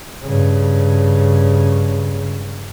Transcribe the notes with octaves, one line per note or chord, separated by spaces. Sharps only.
G2 C#3